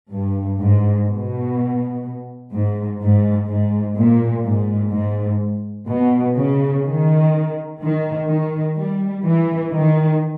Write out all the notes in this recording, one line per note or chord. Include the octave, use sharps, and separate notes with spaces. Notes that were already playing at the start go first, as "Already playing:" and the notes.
G2
G#2
B2
G#2
G#2
G#2
A#2
G#2
G#2
B2
C#3
D#3
D#3
D#3
G3
E3
D#3